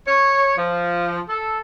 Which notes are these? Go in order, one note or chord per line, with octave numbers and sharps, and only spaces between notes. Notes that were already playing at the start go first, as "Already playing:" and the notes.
C#5
F3
A4